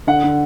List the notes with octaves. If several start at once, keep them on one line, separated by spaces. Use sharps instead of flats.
D3 F#5
D3